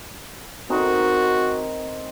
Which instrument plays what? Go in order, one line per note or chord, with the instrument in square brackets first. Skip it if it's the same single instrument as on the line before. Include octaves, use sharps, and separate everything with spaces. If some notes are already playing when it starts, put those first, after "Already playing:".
[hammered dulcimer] C4 D#4 A#4 [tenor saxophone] F#4